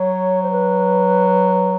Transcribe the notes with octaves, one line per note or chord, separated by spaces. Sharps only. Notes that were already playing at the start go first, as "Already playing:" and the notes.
Already playing: F#3 C#5
C5
B4